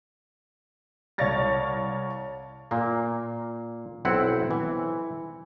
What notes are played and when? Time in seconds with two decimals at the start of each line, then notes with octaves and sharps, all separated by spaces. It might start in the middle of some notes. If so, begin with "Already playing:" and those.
1.18 C2 C#5 D5 F5 A6 A#6
2.71 A#2 A#3
4.05 B1 C4 E4 F#5
4.51 E3